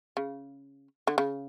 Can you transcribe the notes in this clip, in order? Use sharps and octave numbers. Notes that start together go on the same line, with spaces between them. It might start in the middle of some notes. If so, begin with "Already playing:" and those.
C#3
D3
C#3